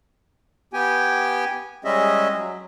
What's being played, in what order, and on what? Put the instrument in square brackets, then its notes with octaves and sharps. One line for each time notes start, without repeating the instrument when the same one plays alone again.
[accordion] B3 G4 G5 G#5
G3 G#3 C#4 G#4 D#5 E5
F#3